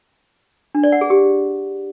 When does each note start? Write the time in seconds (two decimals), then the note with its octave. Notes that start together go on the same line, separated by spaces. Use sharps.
0.75 D4
0.84 D5
0.92 F#5
1.01 G#4
1.10 G4